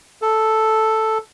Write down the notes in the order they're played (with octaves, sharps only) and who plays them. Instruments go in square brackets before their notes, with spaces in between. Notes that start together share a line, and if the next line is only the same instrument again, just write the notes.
[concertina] A4